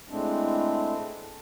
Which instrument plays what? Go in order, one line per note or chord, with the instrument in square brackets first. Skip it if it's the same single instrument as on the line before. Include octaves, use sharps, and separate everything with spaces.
[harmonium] A2 G#3 A3 C4 D4